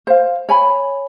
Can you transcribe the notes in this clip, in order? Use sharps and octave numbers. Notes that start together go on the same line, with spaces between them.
C5 F5
C#5 G#5 B5